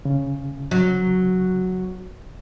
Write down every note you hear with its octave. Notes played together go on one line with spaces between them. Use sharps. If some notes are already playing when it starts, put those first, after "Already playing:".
C#3
F#3